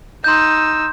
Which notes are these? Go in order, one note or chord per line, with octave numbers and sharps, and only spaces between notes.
D#4 C6 E6 G6